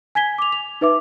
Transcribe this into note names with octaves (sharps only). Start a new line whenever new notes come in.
G#5 G#6 B6 G7
D6 F7
F7
D#4 B4 E5 D6